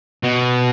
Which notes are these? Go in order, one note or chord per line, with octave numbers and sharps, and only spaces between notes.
B2